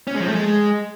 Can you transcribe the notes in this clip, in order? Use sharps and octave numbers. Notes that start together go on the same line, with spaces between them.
C#4
G#3
F3
A3
G#3